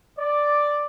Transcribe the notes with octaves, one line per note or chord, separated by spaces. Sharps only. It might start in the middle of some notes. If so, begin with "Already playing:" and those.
D5